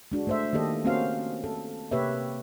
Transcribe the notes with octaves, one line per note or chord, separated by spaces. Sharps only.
G#3 D4 F#4
A3 C5 E5
D#3 A#3 G4 A4 D#5
A#3 C4 C#4 F#4 C5 F5
A4
C3 A#3 G4 B4 C#5 E5